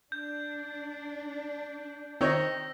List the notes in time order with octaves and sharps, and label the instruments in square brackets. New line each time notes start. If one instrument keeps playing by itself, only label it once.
[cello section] D4 [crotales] G6
[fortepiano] D#3 D#4 C#5 [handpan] C4 [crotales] E6 A#6